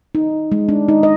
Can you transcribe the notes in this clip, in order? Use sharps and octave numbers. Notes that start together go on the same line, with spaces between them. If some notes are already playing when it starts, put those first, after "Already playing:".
D#4
G#3
D4
D#4
D#5